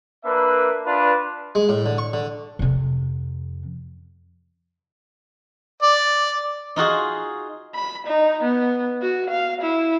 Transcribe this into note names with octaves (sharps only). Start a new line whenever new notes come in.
A#3 D4 B4 E5
D4 F4 B4
G#3
A2
D3
C#6
D3
F2 C3
D5
D#4 F4 F#4 G#4
B5
D#4
B3
F#4
F5
E4